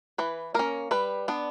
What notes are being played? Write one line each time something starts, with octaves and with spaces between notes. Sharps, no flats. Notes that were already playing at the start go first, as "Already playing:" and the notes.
E3 B4
A#3 C#4 A#4
G3 B4
B3 D4